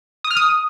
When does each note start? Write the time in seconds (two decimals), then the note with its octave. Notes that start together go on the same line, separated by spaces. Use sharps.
0.24 D#6
0.31 F6
0.37 D#6